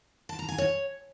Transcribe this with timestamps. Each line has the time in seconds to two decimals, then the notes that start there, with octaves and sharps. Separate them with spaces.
0.29 A5
0.39 A#5
0.49 G#5
0.58 C#5